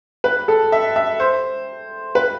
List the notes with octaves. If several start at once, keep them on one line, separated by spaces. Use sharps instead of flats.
B4
A4
E5
E5
C5
B4